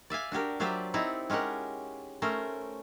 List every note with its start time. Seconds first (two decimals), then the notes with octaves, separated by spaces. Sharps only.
0.10 D5 E5 F5 G#5
0.32 D4 F#4 G4 A#4
0.60 F#3 F4 G4 C5 D5 E5
0.94 C4 D#4 E4 D5 A#5
1.30 G#3 C#4 G4 A#4 F#5
2.22 A3 C#4 A#4 C5